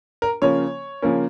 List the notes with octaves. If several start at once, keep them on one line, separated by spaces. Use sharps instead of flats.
A#4
C#3 F3 A#3 C#4 C#5
C#3 F3 A#3 C#4